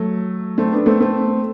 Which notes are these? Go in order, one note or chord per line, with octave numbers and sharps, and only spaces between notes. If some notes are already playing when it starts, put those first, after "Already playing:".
Already playing: F#3 A3
A3 C4
B3 D4
A3 C4
A3 C4